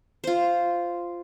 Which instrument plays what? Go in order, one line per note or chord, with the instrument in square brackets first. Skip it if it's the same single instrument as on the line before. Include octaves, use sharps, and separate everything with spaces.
[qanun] F4 C5